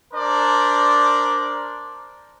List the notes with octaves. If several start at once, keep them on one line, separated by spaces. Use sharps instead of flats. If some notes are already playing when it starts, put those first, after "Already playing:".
D4 A#4 C5 D5